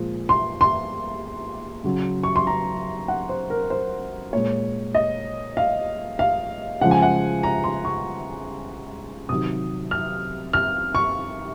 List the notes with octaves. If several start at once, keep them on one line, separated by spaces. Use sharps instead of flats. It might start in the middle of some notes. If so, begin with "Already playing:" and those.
Already playing: A#2 F3 G#3
C6
C6
C#3 F#3
C#6
C6
A#5
F#5
C5
A#4
C5
A#2 G#3 C#5
D#5
F5
F5
C#3 F3 G#3 F#5
G#5
F#5
A#5
C6
C#6
C3 D#3 F#3 D#6
F6
F6
C#6